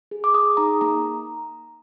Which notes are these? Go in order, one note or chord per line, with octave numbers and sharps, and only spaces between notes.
G#4
D6
G#4 D#6
D#4 A#5
A#3 A#5